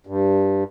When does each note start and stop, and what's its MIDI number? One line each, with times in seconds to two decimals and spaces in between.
0.07 0.64 43